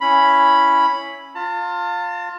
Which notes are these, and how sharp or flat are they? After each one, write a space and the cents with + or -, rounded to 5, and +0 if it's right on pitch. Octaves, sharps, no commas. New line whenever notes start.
C#4 +0 E4 +0 B5 +0
F4 +10 A5 +40